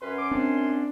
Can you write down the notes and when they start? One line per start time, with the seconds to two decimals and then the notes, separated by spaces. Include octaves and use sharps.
0.02 F#2 C#4 B4 C6
0.18 D6
0.31 C4 D4